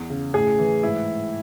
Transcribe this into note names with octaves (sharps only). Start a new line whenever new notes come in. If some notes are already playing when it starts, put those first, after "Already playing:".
Already playing: E2
C#3
A2 G#4
E3
G#2 E4